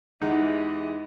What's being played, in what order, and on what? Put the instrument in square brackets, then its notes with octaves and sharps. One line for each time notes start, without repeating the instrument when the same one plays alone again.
[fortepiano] E2 G#3 F#5 [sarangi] E3 [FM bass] D#4 [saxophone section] G4 D#5